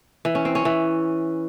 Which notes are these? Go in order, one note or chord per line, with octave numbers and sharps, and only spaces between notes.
E3
C#4
C4
C#4
E3